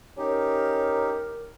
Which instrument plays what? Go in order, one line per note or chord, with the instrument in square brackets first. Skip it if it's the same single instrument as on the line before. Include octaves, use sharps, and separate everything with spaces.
[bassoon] C#4 [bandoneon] D#4 G4 [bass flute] A#4